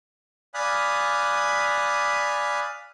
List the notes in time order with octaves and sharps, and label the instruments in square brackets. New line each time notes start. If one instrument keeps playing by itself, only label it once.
[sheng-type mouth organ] D5 F5 G#5 B5 D#6 F#6